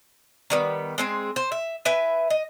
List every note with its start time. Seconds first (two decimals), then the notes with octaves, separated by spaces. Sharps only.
0.50 D#3 G3 B3
0.98 G#3 C4 G#4
1.36 C5
1.52 E5
1.85 E4 B4 E5 G#5
2.30 D#5